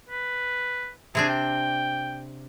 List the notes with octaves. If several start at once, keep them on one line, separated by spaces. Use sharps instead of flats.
B4
C3 C4 D4 G#4
G5